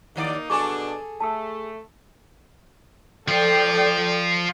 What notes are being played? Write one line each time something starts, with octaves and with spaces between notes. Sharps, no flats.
D#2 D#3 A#3 D#4 D5
B2 D4 G#4 A4 G#5 C#6 D6
A3 A5 E6
F3 F4 A4 D5 G5